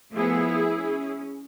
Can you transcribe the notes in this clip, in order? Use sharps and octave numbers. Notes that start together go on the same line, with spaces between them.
F3 A3 B3 E4 G#4
C#4